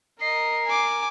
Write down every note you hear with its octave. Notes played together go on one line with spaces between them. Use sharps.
A#4 D#5 C7
G#5 D6